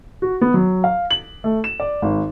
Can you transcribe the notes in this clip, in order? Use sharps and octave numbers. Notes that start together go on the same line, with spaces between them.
F#4
B3
F#3
F5
F#7
A3
E7
D5
G#1